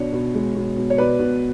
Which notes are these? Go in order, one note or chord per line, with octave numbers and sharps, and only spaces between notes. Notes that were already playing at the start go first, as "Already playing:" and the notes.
Already playing: B2 D4 C#5
B2
G#3
B2
B2
C#5
B2 B4 D5
B2